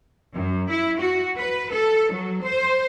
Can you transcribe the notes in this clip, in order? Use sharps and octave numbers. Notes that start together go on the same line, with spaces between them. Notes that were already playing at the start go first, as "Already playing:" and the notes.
F#2
E4
F#4
B4
A4
F#3
C5